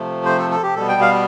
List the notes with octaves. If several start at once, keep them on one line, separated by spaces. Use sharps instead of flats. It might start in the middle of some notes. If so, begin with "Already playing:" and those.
Already playing: C3 F3 A3
C5
A4
A4
G4
B2 G3 B3 A4
G5
F5